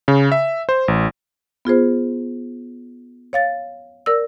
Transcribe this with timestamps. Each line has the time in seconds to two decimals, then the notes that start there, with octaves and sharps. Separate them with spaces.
0.08 C#3
0.32 E5
0.69 C5
0.88 A1
1.65 B3 F4 G#4 C5
3.33 C#5 F5 A6
4.06 A#4 D5 E6